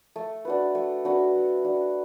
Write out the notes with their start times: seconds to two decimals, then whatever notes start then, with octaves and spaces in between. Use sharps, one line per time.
0.16 A3
0.45 D4 F#4 B4
0.75 A3
1.05 D4 F#4 B4
1.34 A3
1.64 D4 F#4 B4